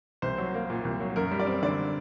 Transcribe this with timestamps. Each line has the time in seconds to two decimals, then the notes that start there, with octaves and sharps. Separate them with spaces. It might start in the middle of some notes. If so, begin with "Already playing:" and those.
0.22 C2 C5
0.38 F#3
0.54 A#3
0.70 A#2
0.85 C2
1.00 F#3
1.16 F#2 A#4
1.31 G3
1.40 D5
1.47 C4
1.62 D3 D5